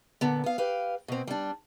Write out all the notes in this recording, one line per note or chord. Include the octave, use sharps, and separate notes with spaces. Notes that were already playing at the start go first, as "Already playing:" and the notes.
A#2 D3 B3
B3 F5
G4 B4 F5
B2 C4
G3 D4